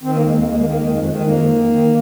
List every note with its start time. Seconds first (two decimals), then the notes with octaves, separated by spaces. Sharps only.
0.03 D#3 C4
0.15 A#3
0.19 D#2
0.25 G#3
0.33 D#2 A#3
0.48 D#2 G#3
0.59 A#3
0.62 D#3
0.69 A#3
0.78 D#3 G#3
0.92 F2 G#3
1.07 D#3
1.15 G#3
1.21 F2 A#3
1.37 D#3
1.50 D#3
1.66 D#3